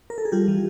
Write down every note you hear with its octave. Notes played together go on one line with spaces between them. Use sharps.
A#4
A4
G#4
G3 F4 G4
E3